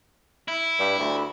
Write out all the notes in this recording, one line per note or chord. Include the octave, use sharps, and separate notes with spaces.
E4
G2
D2